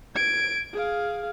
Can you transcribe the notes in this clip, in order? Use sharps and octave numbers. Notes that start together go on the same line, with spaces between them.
G#6 D7
G#4 F5